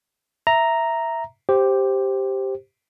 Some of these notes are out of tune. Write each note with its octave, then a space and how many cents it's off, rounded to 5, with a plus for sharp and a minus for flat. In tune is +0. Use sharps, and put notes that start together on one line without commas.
E5 +0 A#5 +0
G4 +0 C5 +5